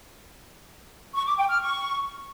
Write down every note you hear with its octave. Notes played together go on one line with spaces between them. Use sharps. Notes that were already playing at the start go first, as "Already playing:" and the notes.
C#6
D6
G5
F6
C#6